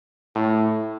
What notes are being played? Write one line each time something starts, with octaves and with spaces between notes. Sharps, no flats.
A2